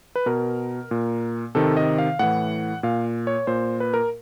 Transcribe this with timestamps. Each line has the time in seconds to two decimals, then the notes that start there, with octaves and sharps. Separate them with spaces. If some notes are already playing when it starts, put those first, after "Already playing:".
0.16 B4
0.26 B2 A#4
0.91 A#2
1.55 C3 D#3 A4
1.77 D#5
1.98 F5
2.19 A2 E3 F#5
2.83 A#2 F5
3.27 C#5
3.47 A#2 C5
3.80 B4
3.94 A#4